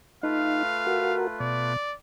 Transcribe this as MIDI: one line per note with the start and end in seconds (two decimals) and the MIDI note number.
0.23 1.73 57
0.23 0.63 63
0.23 1.73 65
0.23 1.73 71
0.23 1.17 77
0.86 1.27 66
0.86 1.27 70
1.40 1.77 47
1.40 1.95 74